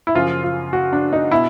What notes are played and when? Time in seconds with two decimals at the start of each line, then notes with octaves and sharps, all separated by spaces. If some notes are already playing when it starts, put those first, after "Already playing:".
0.07 E4
0.15 F#2 C#3 F3 F4
0.44 F4
0.73 F#4
0.93 D4
1.13 D#4
1.31 B2 E4